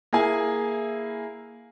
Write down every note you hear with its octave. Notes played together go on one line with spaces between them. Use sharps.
A#3 E4 G#4 G#5